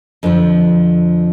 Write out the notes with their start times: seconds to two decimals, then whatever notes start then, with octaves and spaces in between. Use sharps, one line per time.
0.23 F2 D3 F3